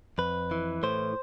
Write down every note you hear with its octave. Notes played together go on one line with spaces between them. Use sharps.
F2 B4
E3
A2 C5